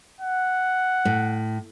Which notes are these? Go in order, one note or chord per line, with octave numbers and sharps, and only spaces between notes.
F#5
A2